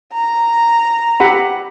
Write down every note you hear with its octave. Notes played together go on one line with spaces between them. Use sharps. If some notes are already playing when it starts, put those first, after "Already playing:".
A#5
G4 F#5 B5